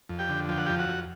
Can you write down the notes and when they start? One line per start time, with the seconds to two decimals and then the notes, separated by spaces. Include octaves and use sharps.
0.09 F2
0.19 G4 G5
0.29 D3
0.49 F3 G5
0.58 F#5
0.66 F2 G4 G5
0.79 F#4 F#5
0.89 F2